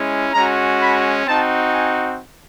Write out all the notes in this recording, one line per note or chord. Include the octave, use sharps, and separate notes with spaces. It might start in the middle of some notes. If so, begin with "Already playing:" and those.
Already playing: G#3 C#4 E4
G#3 C#4 F#4 A#5
B5
C4 D#4 F#4 A5
G#5